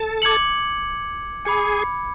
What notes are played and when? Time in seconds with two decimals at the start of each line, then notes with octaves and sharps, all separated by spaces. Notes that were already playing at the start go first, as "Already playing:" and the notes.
Already playing: A4 A5
0.22 D6 G#6 C#7 F#7
1.45 G#4 G#5 B5 D6 G#6 C#7